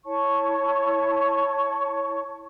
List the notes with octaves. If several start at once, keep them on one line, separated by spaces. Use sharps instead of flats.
E4 C#5 A5 C#6